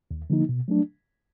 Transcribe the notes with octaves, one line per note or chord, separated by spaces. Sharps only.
D#2
D3 F3 A#3 D#4
B2
F#3 A3 D4